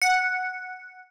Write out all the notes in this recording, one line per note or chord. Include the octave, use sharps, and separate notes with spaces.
F#5